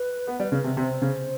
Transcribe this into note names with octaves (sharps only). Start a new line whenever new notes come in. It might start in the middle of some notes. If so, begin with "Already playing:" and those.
Already playing: B4
B3
G3
C#3
C3
C3 C5
C#3